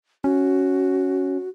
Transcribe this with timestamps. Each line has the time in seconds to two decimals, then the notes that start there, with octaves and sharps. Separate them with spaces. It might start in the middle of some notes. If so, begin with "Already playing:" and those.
0.24 C#4 F#4